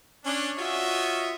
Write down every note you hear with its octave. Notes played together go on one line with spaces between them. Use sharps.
C#4 D4
F4 F#4 C#5 D#5 E5